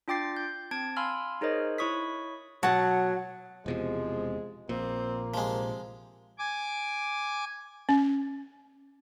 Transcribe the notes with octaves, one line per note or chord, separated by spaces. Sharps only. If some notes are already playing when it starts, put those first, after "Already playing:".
D4 F4 G5 D6 A6 C7
G6
C4 A5 G#6 D7
F5 G#5 B5 C6 E6 F6
D#4 G#4 A#4 C5 C#5 D#5
E4 C#5 C#6 D#6 B6
B2 F#3 F#4 F#5 A5
E1 E2 C3 F3 G#3
A#1 A#2 A#3 C4
C3 F3 G#3
G#5 D6
C#4